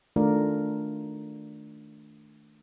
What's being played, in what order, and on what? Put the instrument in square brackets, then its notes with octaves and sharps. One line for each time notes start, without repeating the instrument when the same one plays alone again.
[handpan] D#3 A3 D4 F4 A#4 D5